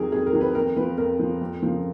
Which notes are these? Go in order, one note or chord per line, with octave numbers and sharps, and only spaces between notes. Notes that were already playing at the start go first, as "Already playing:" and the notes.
Already playing: F2 D#3 F#3 G#4 A#4
F2 G#4
A#4
D#3 F#3
B4
F2 A#4
F3 B4
F2 A#4
F3
F2
C#3 F3